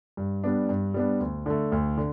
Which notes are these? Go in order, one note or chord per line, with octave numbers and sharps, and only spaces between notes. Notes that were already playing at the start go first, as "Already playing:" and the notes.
G2
G3 B3 D4
G2
G3 B3 D4
D2
D3 A3
D2
D3